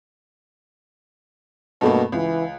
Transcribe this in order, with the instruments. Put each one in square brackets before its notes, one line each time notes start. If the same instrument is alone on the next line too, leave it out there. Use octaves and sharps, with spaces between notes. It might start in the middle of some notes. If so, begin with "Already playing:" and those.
[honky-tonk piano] G2 A3 A#3 [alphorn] B2
[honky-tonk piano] C#2 [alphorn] E3